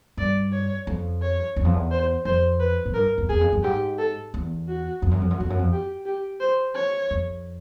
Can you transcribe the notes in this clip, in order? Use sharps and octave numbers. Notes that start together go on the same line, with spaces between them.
G2 D5
C#5
F2
C#5
E2
F2
E2
C5
F2 C5
B4
G#2
G2 A#4
F2
E2 G#4
F2
F#2
G#2 G4
A4
E2
F#4
F2
F#2
F2
F#2
F2 F#4
F#2
F2
G4
G4
C5
C#5
F2